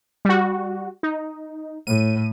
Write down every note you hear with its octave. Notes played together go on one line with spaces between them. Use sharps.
G3 F#4
D#4
A2 D#7